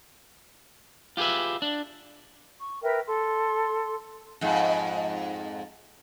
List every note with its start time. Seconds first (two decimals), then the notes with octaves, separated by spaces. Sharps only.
1.17 F4 G4 G#4 B4 E5
1.62 D4
2.58 C#6
2.82 A#4 B4 E5 G5
3.06 A4 C6
4.41 F2 G#2